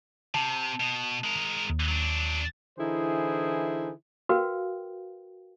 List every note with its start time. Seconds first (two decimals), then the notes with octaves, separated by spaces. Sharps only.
0.34 C3 A5
0.80 B2
1.24 G#3 A#4
1.70 D#2
1.88 F#3 D4
2.78 D3 E3 D#4 E4 G#4 C5
4.29 F#4 A#4 B4 F5 G5